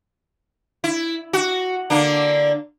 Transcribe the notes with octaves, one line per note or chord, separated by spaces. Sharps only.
E4
F#4
D3 A#3 D4